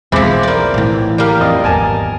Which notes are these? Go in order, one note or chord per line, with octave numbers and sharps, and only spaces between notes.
B1 E2 E3 F3 G#3 C4 B5 D6
A#3 D5
A2 E3
G3 A#3 G4 F5
F2 D5 D#5 F5
G#1 E2 B3 A#4 G#5 A5